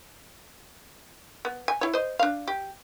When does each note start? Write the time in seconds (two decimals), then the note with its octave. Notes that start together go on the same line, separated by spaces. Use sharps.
1.45 B3
1.68 G#5
1.81 E4 C#5
1.94 C5 D#5
2.19 D4 F5
2.48 G4